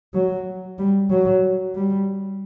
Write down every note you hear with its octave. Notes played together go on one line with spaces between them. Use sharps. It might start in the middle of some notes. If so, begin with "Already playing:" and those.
F#3
G3
F#3
G3